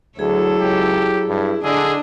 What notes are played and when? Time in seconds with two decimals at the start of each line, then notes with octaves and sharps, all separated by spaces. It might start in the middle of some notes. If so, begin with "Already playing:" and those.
0.19 D2 F#3 E4 G#4 A4
0.60 C#2 G4
1.29 G2 E4
1.64 D3 D4 G#4 D#5 E6